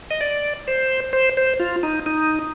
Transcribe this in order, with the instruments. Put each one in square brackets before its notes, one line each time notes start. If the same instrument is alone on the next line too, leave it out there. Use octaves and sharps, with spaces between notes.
[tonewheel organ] D#5
D5
C5
C5
C5
F4
D#4
D#4